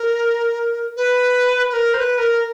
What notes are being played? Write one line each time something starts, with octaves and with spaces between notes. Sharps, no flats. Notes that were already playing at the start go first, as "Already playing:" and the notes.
Already playing: A#4
B4
B4
A#4
C5
B4
A#4